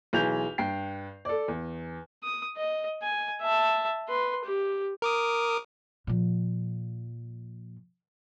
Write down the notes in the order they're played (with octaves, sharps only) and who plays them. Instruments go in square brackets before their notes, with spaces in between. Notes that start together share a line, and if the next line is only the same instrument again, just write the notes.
[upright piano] B1 E3 G#4 G6 F7
G2 G5 C7
A4 D5
E2
[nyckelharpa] D#6
D#5
G#5
E5 A5
B4 C6
G4
[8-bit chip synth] A#4 D6 D#6
[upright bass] A#2 F3